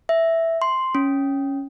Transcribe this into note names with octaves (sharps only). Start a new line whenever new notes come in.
E5
C6
C#4